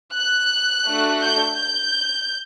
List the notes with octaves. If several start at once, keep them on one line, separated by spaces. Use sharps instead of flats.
F#6
A3 D4 F#4 A4
G6
G6